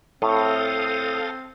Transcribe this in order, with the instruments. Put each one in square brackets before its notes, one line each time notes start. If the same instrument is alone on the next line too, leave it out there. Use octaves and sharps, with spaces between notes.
[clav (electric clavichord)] A2 [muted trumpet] C4 [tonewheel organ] A4 F5 D#6